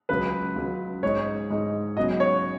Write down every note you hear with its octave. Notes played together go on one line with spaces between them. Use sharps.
C#2 C#3 F#3 B4
C#2 C#3 F#3
G#2 G#3 D#4 C#5
G#2 G#3 D#4
C#3 F#3 B3 D#4 D#5
C#5